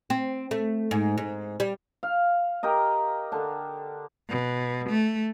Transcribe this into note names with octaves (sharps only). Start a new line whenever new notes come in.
C4
A3
G#2
G#2
G3
F5
G4 A#4 D#5
D3 D4
B2
A3